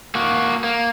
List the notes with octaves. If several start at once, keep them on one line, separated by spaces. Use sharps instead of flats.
A#3 F#4
A#3